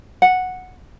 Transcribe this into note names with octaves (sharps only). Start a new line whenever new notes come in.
F#5